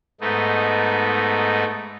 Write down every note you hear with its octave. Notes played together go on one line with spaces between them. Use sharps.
G#2 A3 B3 D#4